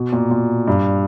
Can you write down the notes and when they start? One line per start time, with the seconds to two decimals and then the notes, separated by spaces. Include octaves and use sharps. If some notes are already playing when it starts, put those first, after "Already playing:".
Already playing: B2
0.13 A#2
0.31 A#2
0.67 G2